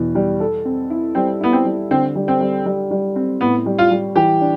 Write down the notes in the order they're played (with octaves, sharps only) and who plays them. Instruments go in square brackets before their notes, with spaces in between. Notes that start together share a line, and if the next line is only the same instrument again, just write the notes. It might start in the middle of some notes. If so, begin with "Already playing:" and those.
Already playing: [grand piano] E2 B2
G3
A4
C4
E4
[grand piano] G3 [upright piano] C4
[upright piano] B3 [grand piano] E4
[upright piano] C4
[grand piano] G3
[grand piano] D3 [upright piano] C4
[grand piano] G3
[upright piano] C4
[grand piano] G3
G3
G3
C4
[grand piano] A2 [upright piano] B3
[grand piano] G3
[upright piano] F4
[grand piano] G3
[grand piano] E3 [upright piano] G4
[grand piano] D4